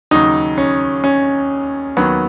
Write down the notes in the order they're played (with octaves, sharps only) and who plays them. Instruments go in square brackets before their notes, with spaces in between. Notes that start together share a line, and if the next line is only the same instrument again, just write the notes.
[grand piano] D#2 C#3 F#3 D#4
C#4
C#4
D#2 D#3 F#3 B3